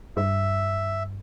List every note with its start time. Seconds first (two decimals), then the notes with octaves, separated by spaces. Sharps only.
0.17 G2 E5